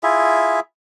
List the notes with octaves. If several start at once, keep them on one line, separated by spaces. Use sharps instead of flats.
E4 F4 G#4 E5